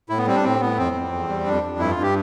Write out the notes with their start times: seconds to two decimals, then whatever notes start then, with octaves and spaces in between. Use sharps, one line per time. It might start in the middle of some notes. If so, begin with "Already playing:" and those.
0.09 A2 E4
0.17 B3
0.27 G3 C4
0.36 D4
0.43 A2 C4
0.60 A2 B3
0.78 F2 C4
0.95 F2
1.12 E2
1.29 G3
1.46 F2 D4
1.63 F2
1.79 G2 E4
1.91 F4
1.96 G2
2.03 G4